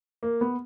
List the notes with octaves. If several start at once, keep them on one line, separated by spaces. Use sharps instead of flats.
A#3
B3